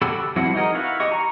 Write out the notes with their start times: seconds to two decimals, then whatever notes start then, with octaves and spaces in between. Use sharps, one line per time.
0.02 F#4 G4 A4 B5 E6
0.36 F3 G3 C4 E4 F#4
0.55 D#4 F#4 G#4 A#4 D#5
0.75 E4 F#4 B4 F5
1.00 G4 D#5 C#6
1.12 A#5 C#6